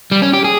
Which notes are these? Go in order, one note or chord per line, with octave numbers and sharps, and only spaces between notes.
G3
C#4
G4
G#4